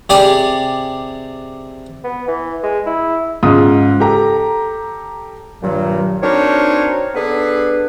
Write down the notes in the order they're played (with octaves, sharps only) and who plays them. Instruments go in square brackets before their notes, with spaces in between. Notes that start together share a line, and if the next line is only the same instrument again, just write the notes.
[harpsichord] C3 G4 G#4 D5 G#5
[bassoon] B3
E3
G#3
E4
[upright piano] G#2 C#3 F4 D#6
G4 A4 A#5
[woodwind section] G2 A#2 D#3 F#3
C4 D4 D#4 F#4 A#4 C#5
B3 D4 G#4 A4 B4